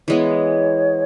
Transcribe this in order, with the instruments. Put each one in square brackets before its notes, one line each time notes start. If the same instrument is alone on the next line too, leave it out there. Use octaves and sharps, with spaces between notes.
[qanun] E3 G#3 B3 [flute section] C#5